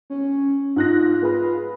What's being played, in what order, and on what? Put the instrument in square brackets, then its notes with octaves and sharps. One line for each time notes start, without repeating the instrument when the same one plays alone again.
[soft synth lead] C#4
[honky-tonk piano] G#2 F#6 A#6 [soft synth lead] F4
[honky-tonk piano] B3 G#4 B4